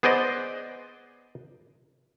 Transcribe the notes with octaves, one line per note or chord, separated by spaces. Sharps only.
B3 G#4 C5 D5 D#5